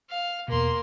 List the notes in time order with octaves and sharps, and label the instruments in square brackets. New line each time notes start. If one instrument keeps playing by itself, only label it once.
[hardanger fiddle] F5
[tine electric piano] E2 B2 [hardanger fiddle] A#3 C6